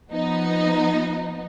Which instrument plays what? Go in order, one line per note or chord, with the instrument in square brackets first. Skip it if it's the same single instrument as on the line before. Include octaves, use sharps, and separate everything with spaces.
[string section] F3 B3 D#4